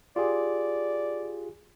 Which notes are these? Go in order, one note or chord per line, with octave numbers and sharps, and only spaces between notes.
F4 G4 G#4 D5